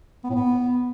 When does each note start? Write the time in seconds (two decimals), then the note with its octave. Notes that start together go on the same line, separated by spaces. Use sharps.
0.24 B3
0.30 A2
0.35 B3